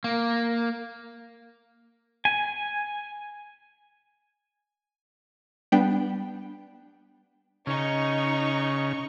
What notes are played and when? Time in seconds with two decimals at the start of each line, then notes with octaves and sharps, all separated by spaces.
0.04 A#3
2.25 G#5
5.72 G3 B3 D4 G5
7.67 C#3 D#4 C#6